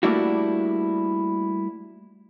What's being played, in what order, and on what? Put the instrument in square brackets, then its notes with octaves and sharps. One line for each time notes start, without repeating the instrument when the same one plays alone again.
[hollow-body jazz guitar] G3 A3 A#3 D4 E4 F#4